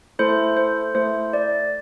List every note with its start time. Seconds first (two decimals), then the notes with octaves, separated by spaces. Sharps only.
0.19 A3 E4 A4 C5
0.57 C5
0.94 A3 E4 A4 C5
1.33 D5